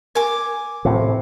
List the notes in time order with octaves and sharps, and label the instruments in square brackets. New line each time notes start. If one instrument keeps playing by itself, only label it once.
[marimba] A#4 [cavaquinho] G#5 D6
[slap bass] A2 C3